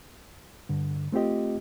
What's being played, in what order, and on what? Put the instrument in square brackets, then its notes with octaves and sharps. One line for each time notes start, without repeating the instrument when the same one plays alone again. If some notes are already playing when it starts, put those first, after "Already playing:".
[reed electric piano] G2 D3
A3 C4 F4 G4 D#5